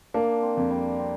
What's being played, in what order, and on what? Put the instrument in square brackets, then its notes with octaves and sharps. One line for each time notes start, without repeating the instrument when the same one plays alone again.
[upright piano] A#3 [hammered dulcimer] D4
[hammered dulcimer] C4
[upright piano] F2
[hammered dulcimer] G3
C4